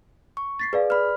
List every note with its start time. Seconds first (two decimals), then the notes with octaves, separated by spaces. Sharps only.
0.37 C#6
0.59 A6 B6 C7
0.73 G#4 B4 D5 F5
0.90 B4 D5 B5 F6